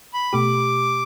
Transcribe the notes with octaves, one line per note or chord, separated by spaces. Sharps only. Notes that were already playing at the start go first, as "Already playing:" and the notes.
B5
B2 A3 G4 D6